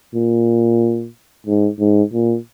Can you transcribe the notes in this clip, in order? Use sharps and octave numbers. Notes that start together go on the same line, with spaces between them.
A#2
G#2
G#2
A#2